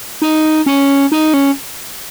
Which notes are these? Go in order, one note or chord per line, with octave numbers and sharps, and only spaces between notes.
D#4
C#4
D#4
C#4